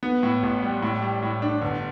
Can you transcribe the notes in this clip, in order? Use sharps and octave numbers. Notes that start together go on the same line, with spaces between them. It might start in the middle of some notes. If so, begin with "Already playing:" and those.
B3
A2
A1
G3
A2
G3
A2
D4
G1